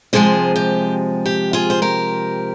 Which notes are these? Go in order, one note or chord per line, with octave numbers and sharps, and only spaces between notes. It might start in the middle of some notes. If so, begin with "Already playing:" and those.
C3 F3 G#3 G#4 C5
G4
G4
F4 G#4
C5
G4 A#4